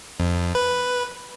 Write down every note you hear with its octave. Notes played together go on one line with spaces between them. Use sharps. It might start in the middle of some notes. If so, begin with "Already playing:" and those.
F2
B4